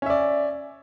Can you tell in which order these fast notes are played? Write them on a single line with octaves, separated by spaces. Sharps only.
C#4 E5 D5